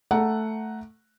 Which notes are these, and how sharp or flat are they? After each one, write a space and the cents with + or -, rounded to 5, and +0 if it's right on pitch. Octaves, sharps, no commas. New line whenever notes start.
A3 +0 F#5 +0 A#5 +0